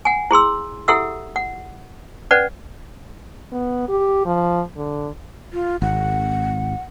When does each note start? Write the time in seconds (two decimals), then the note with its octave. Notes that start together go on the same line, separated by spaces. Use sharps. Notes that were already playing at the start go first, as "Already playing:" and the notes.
0.05 F#5 G#5
0.31 E4 G#4 C6 E6
0.88 E4 G4 A4 E5 F#5 E6
1.36 F#5
2.31 C#4 B4 D5 F#5
3.52 B3
3.88 G4
4.25 F3
4.76 D3
5.52 F4
5.82 G#1 F#5